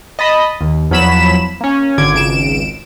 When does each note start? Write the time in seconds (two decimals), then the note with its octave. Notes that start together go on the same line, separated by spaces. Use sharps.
0.19 D#5 A5 B5 D#6
0.61 D#2
0.91 E2 F3 F#3 B5 B6 E7
1.61 A#3 C#4
1.98 G#1 D3 D6 G#6
2.13 G#1 C#2 D7 E7